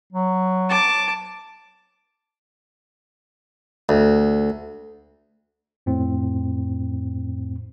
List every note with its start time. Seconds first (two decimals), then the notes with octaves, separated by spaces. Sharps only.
0.12 F#3
0.69 A5 D6
3.89 D2
5.86 F2 A2 C4